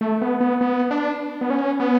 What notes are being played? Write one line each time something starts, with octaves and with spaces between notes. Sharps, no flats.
A3
B3
B3
B3
D4
B3
C#4
B3